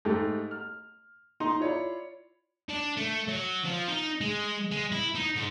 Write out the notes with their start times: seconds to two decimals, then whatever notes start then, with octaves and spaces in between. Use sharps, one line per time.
0.05 G#2 A3 G4
0.51 F6
1.40 D#4 D#5 C6
1.59 E4 F4 C#5 D5
2.69 D4
2.97 A3
3.28 F#3
3.64 F3
3.88 D#4
4.21 G#3
4.71 G#3
4.92 E4
5.15 D#4
5.35 G#2